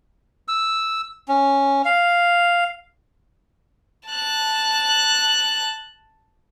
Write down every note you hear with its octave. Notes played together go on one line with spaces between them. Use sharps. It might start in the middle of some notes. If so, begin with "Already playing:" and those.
E6
C#4
F5
A5 F#6